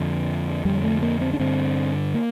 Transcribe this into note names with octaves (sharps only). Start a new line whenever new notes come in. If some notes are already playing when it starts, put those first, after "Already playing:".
Already playing: F2 D3
F2 D3 G3
A3
A#3
C4
D4
G2 D3 C4
A#3